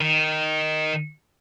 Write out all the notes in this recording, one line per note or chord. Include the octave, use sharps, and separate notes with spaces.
D#3